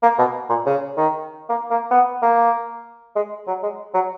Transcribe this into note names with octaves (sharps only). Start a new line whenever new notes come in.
A#3
B2
A#2
C#3
D#3
A#3
A#3
B3
A#3
G#3
F#3
G#3
F#3